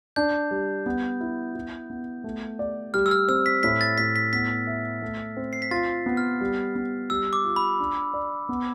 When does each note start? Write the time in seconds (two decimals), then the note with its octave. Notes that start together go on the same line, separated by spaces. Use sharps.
0.16 D4 G6
0.51 G3
0.86 B3
1.21 E4
1.55 E4
1.90 B3
2.24 A3
2.59 D5
2.94 G3 F6
3.06 E6
3.11 F6
3.28 C4 E6
3.46 B6
3.63 A2 B6
3.81 A6
3.98 A2 B6
4.16 B6
4.33 B3 B6
4.67 E5
5.02 A3
5.37 C4
5.53 C7
5.62 B6
5.71 F4 A6
6.06 B3
6.17 F6
6.41 G3
6.75 B3
7.10 G3 E6
7.33 D6
7.45 F4
7.56 B5
7.79 D4
8.14 D5
8.49 B3